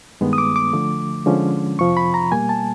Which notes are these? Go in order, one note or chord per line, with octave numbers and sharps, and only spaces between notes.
G2 D#3 G#3 B3
D#6
D6
D6
D3 F3 A3
D3 F3 G#3 C#4
F2 C3 F3 C#6
B5
A#5
B2 G3 A#3 G#5
A5